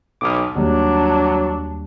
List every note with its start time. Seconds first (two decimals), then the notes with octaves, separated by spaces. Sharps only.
0.21 B1 D6 D#6 F6
0.56 D#2 F#3 G3 D4